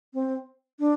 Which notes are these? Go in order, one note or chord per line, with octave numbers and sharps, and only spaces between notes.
C4
D4